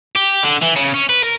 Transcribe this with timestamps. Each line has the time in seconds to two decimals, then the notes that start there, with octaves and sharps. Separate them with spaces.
0.15 G4
0.43 D3
0.62 E3
0.76 C#3
0.94 C#4
1.09 B4
1.23 A#4